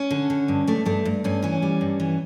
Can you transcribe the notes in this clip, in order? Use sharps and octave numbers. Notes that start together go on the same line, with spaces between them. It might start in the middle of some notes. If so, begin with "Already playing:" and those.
Already playing: C#4
D3
D3
G2
G2 A3
G2 A3
G2
G2 C#4
E3 C#4
G3
G2
E3